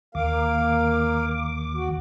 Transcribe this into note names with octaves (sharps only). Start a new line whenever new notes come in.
D#2 A#3 F5 D6
F#4